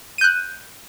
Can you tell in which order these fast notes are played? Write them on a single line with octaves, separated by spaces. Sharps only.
D#7 G6 F#6